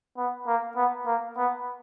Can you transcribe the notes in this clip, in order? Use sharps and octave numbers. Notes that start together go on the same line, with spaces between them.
B3
A#3
B3
A#3
B3